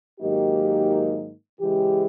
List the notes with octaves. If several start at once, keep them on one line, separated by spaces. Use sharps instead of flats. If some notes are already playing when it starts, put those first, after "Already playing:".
G#2 D#3 F#3 A#3 D#4 G4
C#3 E3 G#3 G4